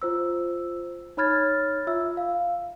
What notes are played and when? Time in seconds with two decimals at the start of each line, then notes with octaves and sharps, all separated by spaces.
0.02 F4 C5 E6
1.17 D#4 C#5 B5 F6 G#6 A6
1.87 F4 E5 E6
2.17 F5